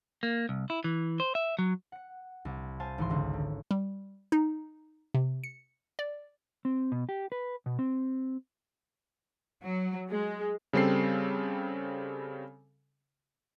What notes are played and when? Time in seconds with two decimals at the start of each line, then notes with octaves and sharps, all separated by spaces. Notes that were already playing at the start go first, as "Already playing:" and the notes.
0.23 A#3
0.49 C2
0.70 E4
0.84 E3
1.20 C5
1.35 E5
1.59 F#3
1.92 F#5 C#7
2.45 C2
2.80 C5 F5 G#5 A5
2.98 G#1 E3 C6
3.10 C#2 D3
3.33 D3
3.71 G3
4.32 D#4
5.14 C3
5.44 C#7
5.99 D5
6.65 C4
6.92 B2
7.09 G4
7.32 B4
7.66 B2
7.79 C4
9.63 F#3
10.10 G#3
10.73 C#3 G3 C4 A4 C7